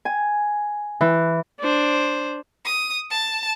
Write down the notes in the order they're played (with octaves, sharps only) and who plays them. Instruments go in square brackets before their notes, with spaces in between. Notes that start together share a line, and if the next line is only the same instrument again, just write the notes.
[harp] G#5
E3
[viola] D4 C5
[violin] D#6
A5